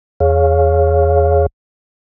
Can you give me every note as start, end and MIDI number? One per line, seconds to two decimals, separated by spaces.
0.20 1.46 40
0.20 1.46 68
0.20 1.46 73
0.20 1.46 77